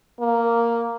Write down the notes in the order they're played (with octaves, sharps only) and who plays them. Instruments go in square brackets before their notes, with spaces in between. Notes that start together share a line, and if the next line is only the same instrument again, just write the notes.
[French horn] A#3